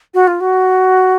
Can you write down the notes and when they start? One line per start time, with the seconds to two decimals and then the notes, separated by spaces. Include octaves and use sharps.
0.14 F#4
0.27 F4
0.40 F#4